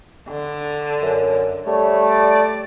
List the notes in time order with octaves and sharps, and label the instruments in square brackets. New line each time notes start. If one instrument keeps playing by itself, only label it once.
[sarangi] D3
[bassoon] F#2
[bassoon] G3 [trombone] A3 [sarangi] C#5
[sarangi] D5